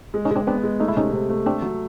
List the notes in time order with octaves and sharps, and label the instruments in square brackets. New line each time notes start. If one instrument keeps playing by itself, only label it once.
[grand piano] G#3
[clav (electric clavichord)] C#4 D#4
[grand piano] G#3
[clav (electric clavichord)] C4 D4
[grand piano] B3 [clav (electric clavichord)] C4 D4
[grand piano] G#3
[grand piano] A3 [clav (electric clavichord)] D#4
[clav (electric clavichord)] E4
[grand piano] C3 [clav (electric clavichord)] C#4 D#4
[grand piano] C3
A3
[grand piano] A3 [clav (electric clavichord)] C4 D4
[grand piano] F#3